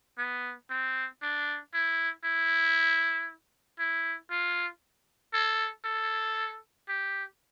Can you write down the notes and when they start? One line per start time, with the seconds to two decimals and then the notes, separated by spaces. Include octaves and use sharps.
0.18 B3
0.70 C4
1.22 D4
1.74 E4
2.25 E4
3.79 E4
4.31 F4
5.34 A4
5.85 A4
6.88 G4